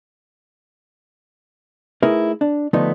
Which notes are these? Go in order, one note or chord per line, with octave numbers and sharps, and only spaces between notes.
A3 D#4 E4 G#4 A#4 B4
D4
D3 F3 A3 B3 D#4